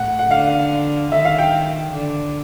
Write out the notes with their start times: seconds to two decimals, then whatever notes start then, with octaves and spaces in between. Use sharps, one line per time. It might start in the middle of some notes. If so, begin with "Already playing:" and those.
Already playing: A2 F#5
0.19 F#5
0.30 D3 F5
1.12 D#3 E5
1.25 F5
1.38 G5
1.93 D3